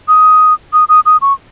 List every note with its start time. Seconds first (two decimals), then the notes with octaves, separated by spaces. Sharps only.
0.08 D#6
0.73 D#6
0.89 D#6
1.06 D#6
1.22 C#6